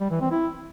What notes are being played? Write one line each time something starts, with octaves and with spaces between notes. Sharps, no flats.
G3
E3
C4
E4